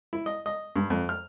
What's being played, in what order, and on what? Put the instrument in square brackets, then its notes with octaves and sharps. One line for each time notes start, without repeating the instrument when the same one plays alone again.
[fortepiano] E4
D#5
D#5
G2
F2
F6